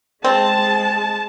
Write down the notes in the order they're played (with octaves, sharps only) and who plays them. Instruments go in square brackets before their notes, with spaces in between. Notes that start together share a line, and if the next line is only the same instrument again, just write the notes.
[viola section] G#3 A5 [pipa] C4